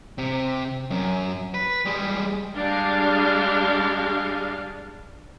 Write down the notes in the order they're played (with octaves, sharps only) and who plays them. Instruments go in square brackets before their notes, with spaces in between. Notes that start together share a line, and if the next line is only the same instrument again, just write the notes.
[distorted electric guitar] C3
F#2
B4
G3 G#3
[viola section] G3 G#3 D4 F5